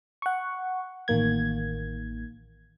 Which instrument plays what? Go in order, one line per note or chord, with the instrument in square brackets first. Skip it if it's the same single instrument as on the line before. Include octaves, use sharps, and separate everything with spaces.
[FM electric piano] F#5 C#6
A1 D#3 A#3 G#6